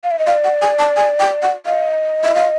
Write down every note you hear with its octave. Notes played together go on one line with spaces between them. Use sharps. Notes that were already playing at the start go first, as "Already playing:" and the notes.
F5
E5
D#5
D5 F5
F#5
G#5
A5
G#5
G5
F#5
D#5 F5
E5
F5